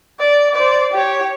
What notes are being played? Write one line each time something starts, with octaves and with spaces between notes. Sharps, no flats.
D5
C5 D5
G4 C#5